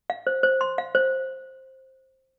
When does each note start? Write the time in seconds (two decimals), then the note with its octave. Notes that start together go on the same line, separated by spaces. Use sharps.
0.10 F5
0.27 C5
0.43 C5
0.61 C6
0.78 F5
0.95 C5